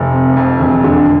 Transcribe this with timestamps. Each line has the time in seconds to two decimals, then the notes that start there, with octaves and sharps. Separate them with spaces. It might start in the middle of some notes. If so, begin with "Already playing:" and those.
Already playing: F1
0.12 C3
0.37 F2
0.60 E1
0.84 D3